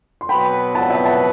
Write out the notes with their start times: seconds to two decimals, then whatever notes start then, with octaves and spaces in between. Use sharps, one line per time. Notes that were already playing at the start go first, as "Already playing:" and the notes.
0.21 C6
0.29 B2 F#3 B3 F#4 B4 G5 B5
0.75 F#5 A5
0.90 E5 G5
1.06 F#5 A5